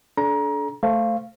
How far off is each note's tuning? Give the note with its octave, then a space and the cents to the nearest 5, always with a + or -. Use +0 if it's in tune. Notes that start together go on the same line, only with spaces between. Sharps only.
D4 -25 A4 -35 A#5 +25
A3 +0 C5 +0 F5 -15